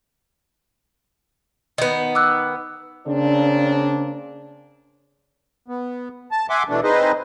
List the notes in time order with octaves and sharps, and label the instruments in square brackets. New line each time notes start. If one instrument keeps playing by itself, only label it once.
[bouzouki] D#3 B3
[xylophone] D6 E6 F#6
[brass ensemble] C#3 A#3 C4 D4
[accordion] B3
A5
E5 F#5 G#5 C6 D6
B2 E3 A3 D4
C4 D#4 G#4 B4 C5 D#5